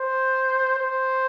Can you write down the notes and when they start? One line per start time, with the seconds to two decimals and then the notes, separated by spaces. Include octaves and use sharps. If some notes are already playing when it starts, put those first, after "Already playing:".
Already playing: C5
0.79 C5